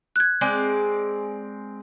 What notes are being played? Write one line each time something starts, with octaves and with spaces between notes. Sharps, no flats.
F#6 G#6
G#3 C4 D5